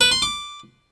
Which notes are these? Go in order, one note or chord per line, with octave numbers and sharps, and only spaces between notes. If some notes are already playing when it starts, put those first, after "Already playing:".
B4
C6
D6